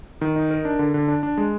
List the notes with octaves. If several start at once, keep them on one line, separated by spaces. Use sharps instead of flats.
D#3
D#4
A#4
D4
D3
D3
D4
D4
G#3